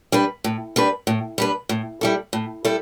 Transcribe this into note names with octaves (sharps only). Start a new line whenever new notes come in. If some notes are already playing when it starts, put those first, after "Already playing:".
G3 D4 B4
A2
G3 D4 B4
A2
G3 D4 B4
A2
G3 E4 A4
A2
G3 E4 A4